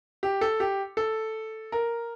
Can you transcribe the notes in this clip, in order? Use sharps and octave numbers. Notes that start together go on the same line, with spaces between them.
G4
A4
G4
A4
A#4